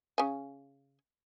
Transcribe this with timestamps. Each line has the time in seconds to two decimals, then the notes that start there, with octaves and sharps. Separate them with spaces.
0.18 C#3 G#5